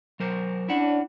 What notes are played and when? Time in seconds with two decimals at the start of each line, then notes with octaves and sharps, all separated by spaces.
0.20 F#3 A#4 C5
0.69 C#4 D4 E4 D5 F#5